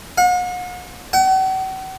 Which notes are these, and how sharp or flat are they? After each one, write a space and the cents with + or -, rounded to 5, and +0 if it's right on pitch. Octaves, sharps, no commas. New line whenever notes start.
F#5 -45
F#5 +40